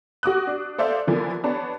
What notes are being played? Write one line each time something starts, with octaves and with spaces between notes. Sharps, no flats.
F#4 D6 D#6 F#6
D4
A4 C5 D5 E5 F5
D3 E3 F3 A#3 B3
B3 D4 C#5 A5